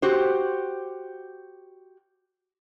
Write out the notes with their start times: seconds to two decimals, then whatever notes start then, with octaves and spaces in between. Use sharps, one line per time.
0.02 F#4 G4 C5